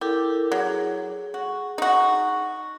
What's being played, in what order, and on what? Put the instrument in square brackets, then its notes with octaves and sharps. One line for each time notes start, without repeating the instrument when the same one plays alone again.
[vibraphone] E4 A4 A#4 [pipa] G4
[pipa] F#3 [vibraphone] G#4
[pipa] F#4
D#4 F#4